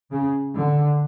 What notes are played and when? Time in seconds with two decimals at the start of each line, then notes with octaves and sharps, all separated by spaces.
0.11 C#3
0.56 D3